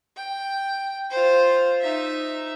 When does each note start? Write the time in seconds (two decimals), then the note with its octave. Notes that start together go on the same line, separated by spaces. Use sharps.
0.16 G5
1.10 F4 C5
1.81 D#4 E5